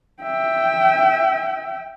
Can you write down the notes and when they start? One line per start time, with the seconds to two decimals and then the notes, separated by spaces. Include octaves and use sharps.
0.22 E5 G5